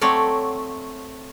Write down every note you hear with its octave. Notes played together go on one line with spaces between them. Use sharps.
F#3 A3 C4 C#5 D5